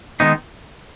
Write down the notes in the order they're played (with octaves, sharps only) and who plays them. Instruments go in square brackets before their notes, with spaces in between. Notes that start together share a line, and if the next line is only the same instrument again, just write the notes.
[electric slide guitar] D#3 G#3 B3 D#4